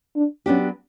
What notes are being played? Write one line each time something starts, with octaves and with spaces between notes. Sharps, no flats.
D4
F#3 B3 C#4 D4 G4